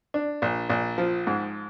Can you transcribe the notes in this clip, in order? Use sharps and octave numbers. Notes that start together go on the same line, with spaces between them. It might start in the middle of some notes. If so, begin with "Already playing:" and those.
D4
A#1
A#1
F3
G#2